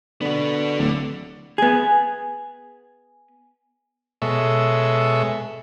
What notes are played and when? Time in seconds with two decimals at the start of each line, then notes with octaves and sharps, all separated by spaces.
0.21 D3 B3 F#4
0.80 D1 D3
1.58 B3 G#4
4.22 B2 G#3 A4 C#5 E5